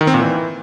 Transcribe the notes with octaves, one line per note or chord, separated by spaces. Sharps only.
D#3
C4
A#2
E3